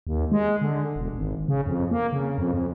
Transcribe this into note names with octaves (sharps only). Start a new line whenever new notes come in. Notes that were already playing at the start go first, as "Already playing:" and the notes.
D#2
G#3
D3
E1
G#1
C#3
F2
A#3
C#3
F2
F2